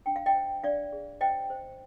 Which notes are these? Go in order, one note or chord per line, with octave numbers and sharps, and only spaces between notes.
D4 G5
F5
D#5 G5
C5
D4 D5 F5
G#4
C5 D#5 G5
C5